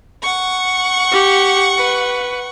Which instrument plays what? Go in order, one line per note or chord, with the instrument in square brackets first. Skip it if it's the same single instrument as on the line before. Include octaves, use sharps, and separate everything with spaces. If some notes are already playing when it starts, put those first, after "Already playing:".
[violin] F#5 C#6
[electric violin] G4
B4